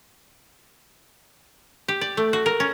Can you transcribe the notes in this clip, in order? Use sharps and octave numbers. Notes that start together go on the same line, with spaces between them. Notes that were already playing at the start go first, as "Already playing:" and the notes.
G4
D5
A3
F#4
A#4
C#4